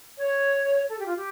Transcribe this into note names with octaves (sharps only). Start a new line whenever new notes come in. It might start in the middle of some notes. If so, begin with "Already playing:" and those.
C#5
A4
G4
F4
G4